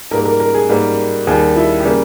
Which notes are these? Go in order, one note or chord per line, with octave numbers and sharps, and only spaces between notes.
G#2 G3 A#3 A#4
A#4
A#4
G#4
G#2 G3 A#3 A#4
D#2 D#3 G3 G#4
E4
G4
C#3 G3 A#3 G#4